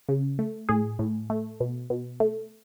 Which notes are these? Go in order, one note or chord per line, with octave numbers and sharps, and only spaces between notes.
C#3
A3
A2 G#4
A2
A3
B2
B2
A3